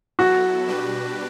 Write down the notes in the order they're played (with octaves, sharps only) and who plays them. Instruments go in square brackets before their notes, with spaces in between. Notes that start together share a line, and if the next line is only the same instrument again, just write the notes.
[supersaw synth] F#3 B3 E4 A4 [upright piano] F#4
[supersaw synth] B2 G3 D4 G4 B4